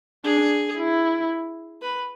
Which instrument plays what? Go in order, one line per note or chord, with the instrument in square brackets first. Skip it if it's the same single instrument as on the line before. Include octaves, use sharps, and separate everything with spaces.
[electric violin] D4 [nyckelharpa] G#4
[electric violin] E4
[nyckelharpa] B4